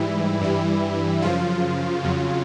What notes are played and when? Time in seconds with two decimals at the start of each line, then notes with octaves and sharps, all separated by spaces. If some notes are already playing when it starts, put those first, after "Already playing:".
Already playing: G#2 E3 G3 E4
0.41 G2 E3 G3
1.22 F#2 C#3 F3 F4
2.04 F2 C#3 F#3